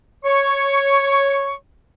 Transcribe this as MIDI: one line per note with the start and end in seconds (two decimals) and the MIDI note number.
0.24 1.54 73
0.24 1.54 85